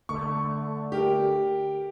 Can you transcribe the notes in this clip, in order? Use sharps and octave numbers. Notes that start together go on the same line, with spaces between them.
D3 A3 C#6
G4 A#4